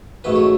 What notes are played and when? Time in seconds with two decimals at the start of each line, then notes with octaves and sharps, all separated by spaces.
0.24 A1 G#2 F#3 A3 B4
0.36 C#5